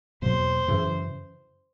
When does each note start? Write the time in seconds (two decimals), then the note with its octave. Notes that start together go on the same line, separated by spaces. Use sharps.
0.22 E2 B2 F#3 A#3 C5
0.68 F#2 C#3 E3